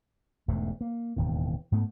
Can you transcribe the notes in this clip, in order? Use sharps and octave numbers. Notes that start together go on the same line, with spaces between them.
E1 E2 G#2 A3
A#3
E1 D#2 A2
G#2 A3 B3